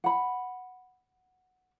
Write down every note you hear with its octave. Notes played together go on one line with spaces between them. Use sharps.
F#5 B5